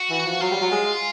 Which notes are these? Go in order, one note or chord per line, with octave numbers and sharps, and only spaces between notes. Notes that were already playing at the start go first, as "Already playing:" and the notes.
Already playing: F#4
E3
F3
F#3 F4
G3
F#3
G#3